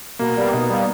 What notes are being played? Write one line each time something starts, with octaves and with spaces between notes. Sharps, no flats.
B2 A#3
G3 A#3 B3
B2 B3 D#4
G3 A#3